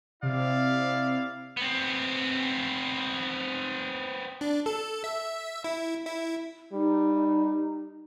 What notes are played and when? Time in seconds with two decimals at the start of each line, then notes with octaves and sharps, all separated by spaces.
0.23 C3 E4 D5 F5
1.57 B3 C4
4.41 D4
4.66 A4
5.04 E5
5.64 E4
6.06 E4
6.73 G3 D#4